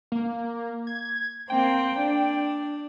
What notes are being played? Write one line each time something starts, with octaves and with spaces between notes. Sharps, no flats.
A#3
G#6
A#3 C4 G5
D4